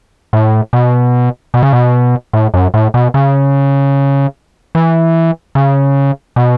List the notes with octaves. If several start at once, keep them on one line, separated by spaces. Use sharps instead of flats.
A2
B2
B2
C#3
B2
A2
F#2
A2
B2
C#3
E3
C#3
B2